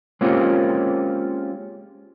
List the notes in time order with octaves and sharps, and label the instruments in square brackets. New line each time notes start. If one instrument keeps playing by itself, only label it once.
[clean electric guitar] G#3 A#3 C4 C#4 F4 G4